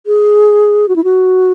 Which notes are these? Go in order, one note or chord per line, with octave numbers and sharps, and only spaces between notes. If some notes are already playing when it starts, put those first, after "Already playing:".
G#4
F#4
E4
F#4